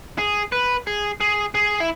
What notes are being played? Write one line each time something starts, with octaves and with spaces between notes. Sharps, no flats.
G#4
B4
G#4
G#4
G#4
E4